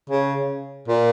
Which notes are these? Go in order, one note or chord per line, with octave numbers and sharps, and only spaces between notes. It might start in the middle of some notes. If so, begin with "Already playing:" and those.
C#3
A#2